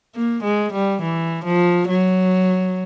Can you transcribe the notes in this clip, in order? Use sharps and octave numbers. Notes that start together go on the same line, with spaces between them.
A#3
G#3
G3
E3
F3
F#3